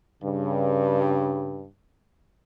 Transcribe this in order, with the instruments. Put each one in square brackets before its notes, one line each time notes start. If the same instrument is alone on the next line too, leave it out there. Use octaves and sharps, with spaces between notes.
[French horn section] G2 C#3